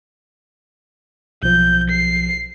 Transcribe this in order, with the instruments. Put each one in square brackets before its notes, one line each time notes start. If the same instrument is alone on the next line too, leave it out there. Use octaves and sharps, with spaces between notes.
[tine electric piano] B1 F3 [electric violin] G6
[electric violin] C7